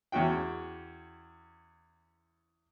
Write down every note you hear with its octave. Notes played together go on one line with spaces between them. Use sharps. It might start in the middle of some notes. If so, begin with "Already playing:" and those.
E2 C#4 F#4 G5